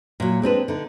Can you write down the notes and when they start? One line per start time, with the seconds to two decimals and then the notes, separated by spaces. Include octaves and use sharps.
0.20 A#2 F#3
0.42 G#3 C4 D4 B4
0.68 D3 D#4